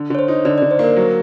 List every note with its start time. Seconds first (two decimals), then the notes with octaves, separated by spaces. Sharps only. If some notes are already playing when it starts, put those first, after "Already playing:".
Already playing: D3
0.10 D3 C#5
0.19 C5
0.28 D#4
0.45 D3 D5
0.58 D5
0.62 D3
0.71 C5
0.79 A#3 A#4
0.97 F#3